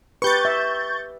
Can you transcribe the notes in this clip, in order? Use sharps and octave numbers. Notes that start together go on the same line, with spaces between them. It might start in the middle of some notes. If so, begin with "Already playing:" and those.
G4 B4 C#6 G6 A6
E5